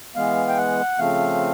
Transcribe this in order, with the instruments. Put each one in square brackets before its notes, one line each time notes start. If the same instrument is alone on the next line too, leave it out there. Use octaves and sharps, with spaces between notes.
[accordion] E3 G#3 B3 F5
G5
F#5
C#3 F3 A3 C4 F5